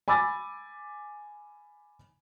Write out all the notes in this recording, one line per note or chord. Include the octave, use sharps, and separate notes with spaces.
G#5 B5 D6 E6 A6